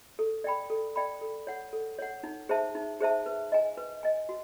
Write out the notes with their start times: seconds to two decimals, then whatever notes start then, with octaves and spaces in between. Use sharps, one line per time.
0.19 A4
0.44 D5 G5 B5
0.70 A4
0.96 D5 G5 B5
1.21 A4
1.47 C#5 F#5
1.73 A4
1.99 C#5 F#5
2.23 D#4
2.49 G#4 C5 E5 A5
2.75 D#4
3.00 G#4 C5 E5 A5
3.26 B4
3.52 D#5 G#5
3.77 B4
4.03 D#5 G#5
4.29 F#4